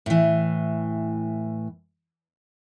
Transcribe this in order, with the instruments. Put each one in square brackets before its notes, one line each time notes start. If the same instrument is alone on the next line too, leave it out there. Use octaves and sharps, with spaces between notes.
[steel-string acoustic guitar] A2 E3